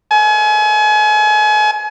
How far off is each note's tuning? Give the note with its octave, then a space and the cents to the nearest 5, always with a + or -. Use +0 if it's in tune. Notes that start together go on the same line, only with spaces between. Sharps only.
G#5 +35